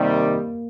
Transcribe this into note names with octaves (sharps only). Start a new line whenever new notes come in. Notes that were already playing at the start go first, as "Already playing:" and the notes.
Already playing: C3 D#3 G3 A#3